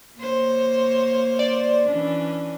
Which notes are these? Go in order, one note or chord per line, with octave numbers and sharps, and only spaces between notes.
A#3 C5 C#5
D5
E3 C#4 D4